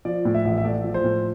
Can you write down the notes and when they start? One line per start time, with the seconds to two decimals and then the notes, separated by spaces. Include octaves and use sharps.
0.05 F3 D5
0.25 A2
0.34 E5
0.45 A1
0.58 E5
0.64 A3 D5
0.84 F3
0.94 C5
1.04 A2